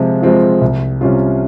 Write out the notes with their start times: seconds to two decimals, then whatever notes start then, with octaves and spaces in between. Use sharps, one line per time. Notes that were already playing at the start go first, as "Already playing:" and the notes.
Already playing: C3 F3 G#3 C4
0.22 F3 G#3 C4 F4
0.61 C2
1.01 C3 G3 C#4 F4